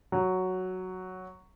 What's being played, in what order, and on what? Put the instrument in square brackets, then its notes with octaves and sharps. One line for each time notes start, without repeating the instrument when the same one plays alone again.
[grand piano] F#3